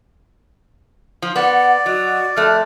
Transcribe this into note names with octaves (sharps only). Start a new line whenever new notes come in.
F3
B3 D5 F#5
F#3 F#4 D#5
F2 A3 F6 F#6